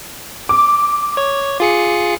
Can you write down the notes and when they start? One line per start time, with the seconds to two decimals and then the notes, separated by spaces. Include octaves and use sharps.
0.49 D6
1.17 C#5
1.60 F4 G#4 C#7